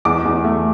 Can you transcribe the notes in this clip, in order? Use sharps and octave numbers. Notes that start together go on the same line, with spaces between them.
E2 D6
E2
A3